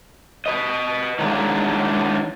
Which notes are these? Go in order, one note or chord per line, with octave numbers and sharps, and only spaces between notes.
B4 D#5
D#3 E3 F#3 G#3 A#3 D4